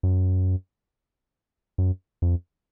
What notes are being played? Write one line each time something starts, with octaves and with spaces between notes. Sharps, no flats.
F#2
F#2
F2